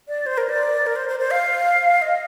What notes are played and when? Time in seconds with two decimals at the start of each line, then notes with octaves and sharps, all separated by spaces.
0.08 D5
0.26 C5
0.38 A#4
0.49 D5
0.86 A#4
0.96 C5
1.09 C5
1.20 C5
1.31 F5
2.02 D#5